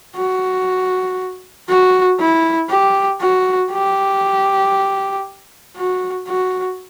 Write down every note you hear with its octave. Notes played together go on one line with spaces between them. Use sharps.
F#4
F#4
E4
G4
F#4
G4
F#4
F#4